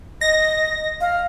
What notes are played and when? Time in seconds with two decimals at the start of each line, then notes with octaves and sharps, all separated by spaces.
0.21 D#5 A#6
1.01 F5